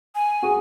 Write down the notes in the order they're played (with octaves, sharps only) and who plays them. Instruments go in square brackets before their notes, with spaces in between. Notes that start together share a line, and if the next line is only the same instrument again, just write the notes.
[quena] G#5
[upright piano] F#4 G#4